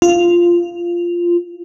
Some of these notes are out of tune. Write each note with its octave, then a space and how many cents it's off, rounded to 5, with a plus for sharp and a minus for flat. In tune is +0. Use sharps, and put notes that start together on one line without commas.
F4 -10